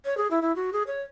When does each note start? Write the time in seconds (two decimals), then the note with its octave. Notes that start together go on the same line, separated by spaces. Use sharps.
0.05 C#5
0.17 G#4
0.31 E4
0.42 E4
0.56 F#4
0.73 G#4
0.87 C#5